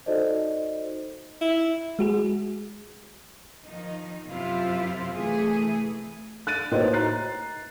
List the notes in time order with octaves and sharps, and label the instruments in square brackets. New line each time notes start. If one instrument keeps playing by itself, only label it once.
[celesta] D#4 F#4 A4 C5 D5 D#5
[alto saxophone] E4
[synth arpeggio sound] G#3 F#4 G#4
[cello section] D#3 F3 D#4
F#2 C3 E4 F4 C5 E5
C3 E3 A3 G#4
[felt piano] F#6 A6 D#7
A2 A#3 D#4 F#4 B4 C5
A#5 F#6 A6 C7